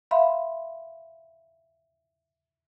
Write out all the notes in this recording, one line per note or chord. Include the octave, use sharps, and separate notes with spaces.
E5 F5 B5 C6